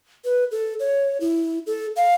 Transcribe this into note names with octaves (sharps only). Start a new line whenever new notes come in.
B4
A4
C#5
E4
A4
F5